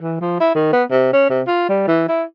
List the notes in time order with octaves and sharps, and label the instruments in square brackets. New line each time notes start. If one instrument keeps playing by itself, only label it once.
[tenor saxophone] E3
F3
E4
D#3
B3
C3
C#4
C3
F4
G3
E3
E4